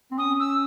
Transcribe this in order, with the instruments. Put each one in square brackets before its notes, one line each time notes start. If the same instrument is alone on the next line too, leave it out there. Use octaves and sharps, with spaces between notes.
[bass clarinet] C4
[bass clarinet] C#4 [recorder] D#6
[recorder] E6